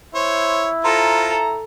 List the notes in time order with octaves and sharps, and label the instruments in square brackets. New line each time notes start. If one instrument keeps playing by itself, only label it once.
[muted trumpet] E4 [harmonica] C5 C#5
[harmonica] F4 C5 [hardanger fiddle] A4 [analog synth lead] A#5